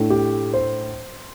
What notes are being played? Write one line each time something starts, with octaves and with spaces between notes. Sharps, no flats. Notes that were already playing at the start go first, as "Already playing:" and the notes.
Already playing: A2 A3 D4
G4
C5